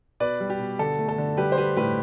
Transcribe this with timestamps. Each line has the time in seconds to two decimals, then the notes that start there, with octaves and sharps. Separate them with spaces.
0.20 B2 B4 D5
0.40 G3
0.50 G4
0.59 B2
0.79 D3 A4
0.99 A3
1.09 A4
1.18 D3
1.37 G3 G4 B4
1.52 C5
1.57 G3 G4 B4
1.76 A2 G4 B4